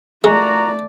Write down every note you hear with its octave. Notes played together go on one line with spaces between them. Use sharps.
A#2 G#3 A3 F#4 D5 A#5